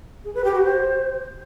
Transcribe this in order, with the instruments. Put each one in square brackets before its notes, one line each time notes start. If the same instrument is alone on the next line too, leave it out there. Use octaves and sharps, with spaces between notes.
[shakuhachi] G#4
B4
G4
F#4
C5